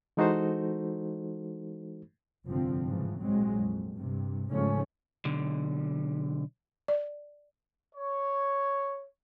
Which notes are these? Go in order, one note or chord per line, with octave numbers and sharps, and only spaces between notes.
E3 G#3 D#4 F#4 A4 C5
F1 G2 D3 F3 C4
G#2 C#3 E3 F3
A#1 F#3 G#3 C4
F2
G2 C3
G#2 C#3 F3 A3 C#4
B1 D3
D5
C#5